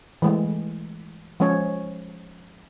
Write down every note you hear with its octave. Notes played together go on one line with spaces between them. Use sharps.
E3 G#3 A3
F3 G#3 C#4 C#5